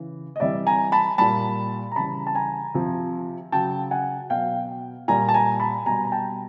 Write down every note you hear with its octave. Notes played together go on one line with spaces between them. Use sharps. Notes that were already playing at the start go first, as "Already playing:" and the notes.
Already playing: C#3 E3
D#5
C3 E3 G3 D5 E5
G#5 A#5
A5 B5
A#2 G3 A5 B5
A#5
C#3 E3 G3 A5 B5
A5
G#5 A#5
C3 F3
C#3 F#3 G5 A5
F#5 G#5
B2 F#3 F5 G5
A#2 G3 G#5 A#5
A5
G#5 A#5
A5 B5
B2 G3 G#5 A#5
A#5
G5 A5